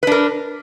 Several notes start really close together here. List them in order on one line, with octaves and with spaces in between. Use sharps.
B4 D4 A#4